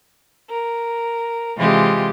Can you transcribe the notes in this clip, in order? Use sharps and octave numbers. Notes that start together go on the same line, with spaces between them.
A#4
C3 E3 G#3 F4 G4